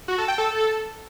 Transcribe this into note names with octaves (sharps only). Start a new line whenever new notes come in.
F#4
A4
G5
A4